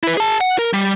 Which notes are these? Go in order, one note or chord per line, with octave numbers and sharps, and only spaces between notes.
E4 B4
G#4 A5
F#5
A#4
G3